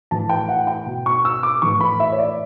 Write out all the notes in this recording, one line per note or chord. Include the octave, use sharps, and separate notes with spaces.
A2 E3 A5
G5
F#5
G5
B2
C#6
E6
D6
A2 E3 C#6
B5
E5
C#5
D5